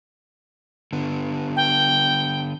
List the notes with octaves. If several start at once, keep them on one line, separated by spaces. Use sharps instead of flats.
D3 B3
G5